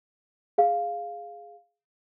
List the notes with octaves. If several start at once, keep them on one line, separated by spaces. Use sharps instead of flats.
G#4 F5